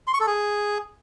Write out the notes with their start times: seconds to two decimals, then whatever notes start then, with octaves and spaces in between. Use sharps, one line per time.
0.07 C6
0.14 C#6
0.20 A4
0.27 G#4